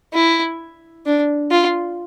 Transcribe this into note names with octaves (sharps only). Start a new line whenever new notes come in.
E4
D4
F4